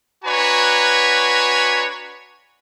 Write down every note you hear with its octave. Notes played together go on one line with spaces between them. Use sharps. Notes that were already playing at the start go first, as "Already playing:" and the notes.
D4 F#4 B4 C#5 G#5 A#5